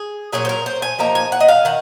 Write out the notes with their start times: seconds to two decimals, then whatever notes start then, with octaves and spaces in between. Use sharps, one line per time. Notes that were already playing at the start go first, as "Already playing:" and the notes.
Already playing: G#4
0.33 A#2 F#3 C#4 G#4
0.45 C5
0.49 A#4
0.66 C5
0.82 G#5
0.99 F3 A#3 D#4 A#5
1.15 G#5
1.32 F#5
1.41 D#5
1.48 F5
1.65 D#3 F#5